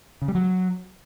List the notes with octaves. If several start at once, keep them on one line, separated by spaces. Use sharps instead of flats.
C#3
G3
F#3